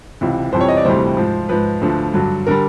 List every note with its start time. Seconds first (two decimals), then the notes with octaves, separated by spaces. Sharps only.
0.21 C#2 C3 E3
0.52 F2 C3 E3 G3 C5
0.61 C#5
0.68 D#5
0.77 D5
0.85 D2 C3 E3 G3 C5
1.17 G#2 F3
1.49 G#2 F3 B4
1.81 D2 D3 F3
2.14 G2 D3 F#3
2.47 D3 G3 A#4